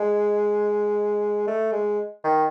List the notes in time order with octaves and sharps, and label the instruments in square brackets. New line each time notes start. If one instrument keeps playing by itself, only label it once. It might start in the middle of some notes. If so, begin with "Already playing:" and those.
Already playing: [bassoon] G#3
A3
G#3
D#3